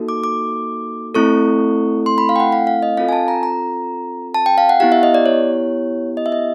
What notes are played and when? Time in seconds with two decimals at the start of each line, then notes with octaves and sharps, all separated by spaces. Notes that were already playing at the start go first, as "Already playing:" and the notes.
Already playing: A#3 D#4 F#4 A4
0.09 D6
0.24 D6
1.15 A3 C4 E4 A4 C#6
2.06 C6
2.18 B5
2.29 F5
2.36 G5
2.40 F#5
2.52 F5
2.67 F5
2.82 D#5
2.97 C4 F4 A4 F5
3.09 G#5
3.13 A5
3.28 A#5
3.43 A#5
4.34 A5
4.46 G5
4.58 F5
4.69 F#5
4.80 B3 E4 G4 F5
4.92 E5
5.03 D#5
5.14 D5
5.26 C#5
6.17 D#5
6.26 E5
6.32 D#5